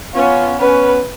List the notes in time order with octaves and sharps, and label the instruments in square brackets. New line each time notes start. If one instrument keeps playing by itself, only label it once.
[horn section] B3 C#4 [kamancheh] F4
[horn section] B3 C#4 [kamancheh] B4